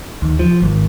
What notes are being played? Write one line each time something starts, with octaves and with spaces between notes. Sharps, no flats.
D#2
F3
G#1